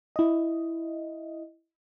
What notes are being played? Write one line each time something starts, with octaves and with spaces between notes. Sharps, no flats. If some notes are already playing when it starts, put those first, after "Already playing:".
E4 D#5